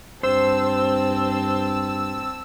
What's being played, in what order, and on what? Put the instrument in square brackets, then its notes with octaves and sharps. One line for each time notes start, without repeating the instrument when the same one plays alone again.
[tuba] G2 [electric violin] C4 A5 [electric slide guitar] C5 [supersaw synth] E6